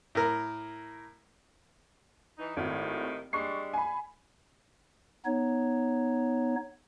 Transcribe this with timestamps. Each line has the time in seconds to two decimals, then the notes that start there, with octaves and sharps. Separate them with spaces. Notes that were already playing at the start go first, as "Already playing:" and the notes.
0.15 A2 A#4
2.38 E3 D#4
2.56 G#1 A2 C3 D#3
3.33 G3 G#3 D4 C#6 C7
3.73 G#5 B5
5.25 B3 D#4 C#5